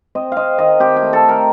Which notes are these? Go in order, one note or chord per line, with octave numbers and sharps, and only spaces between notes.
C4 D#5
C4 D#5 F5
D#3 D#5
C4 G4
G4
A3
A4
D#3 A#4